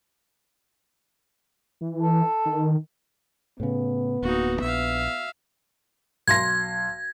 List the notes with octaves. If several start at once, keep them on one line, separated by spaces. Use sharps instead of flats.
E3
A4
D#3
A2 C#3 B3
D1 A#3 D#4 F#4
A#1 E5 F5
B1 C6 G#6 A#6